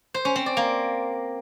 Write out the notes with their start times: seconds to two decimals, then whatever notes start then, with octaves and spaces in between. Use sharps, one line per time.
0.14 C5
0.25 C#4
0.36 C4
0.46 D5
0.57 A#3